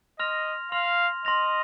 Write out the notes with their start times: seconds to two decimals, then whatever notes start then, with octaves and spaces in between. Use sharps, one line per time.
0.19 D#5 C6 F6 A#6 F7
0.72 F5 C6 F6 A#6 F7
1.25 D#5 C6 F6 A#6 F7